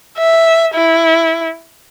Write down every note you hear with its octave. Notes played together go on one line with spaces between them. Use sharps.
E5
E4